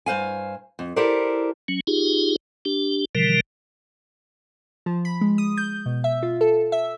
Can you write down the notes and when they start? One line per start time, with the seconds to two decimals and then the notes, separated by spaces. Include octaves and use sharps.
0.06 G2 C5 F5 G#5
0.79 F2
0.96 E4 G4 A4 A#4 C5 D5
1.68 F#3 C#4
1.87 D#4 F4 G4 G#4
2.65 D4 G4
3.15 B2 D3 E3 F3 G3 A#4
4.86 F3
5.05 B5
5.21 G#3
5.38 D#6
5.57 G6
5.86 B2
6.04 E5
6.23 F4
6.41 A4
6.72 E5